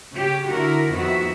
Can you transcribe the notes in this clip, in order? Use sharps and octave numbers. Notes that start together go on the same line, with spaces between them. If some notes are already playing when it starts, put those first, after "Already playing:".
C#3 C#4 G4
D3 E4 F#4 A#4
F2 D#3 B3 F#4 E5